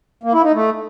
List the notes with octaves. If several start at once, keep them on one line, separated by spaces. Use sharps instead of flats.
A#3
E4
D#4
A3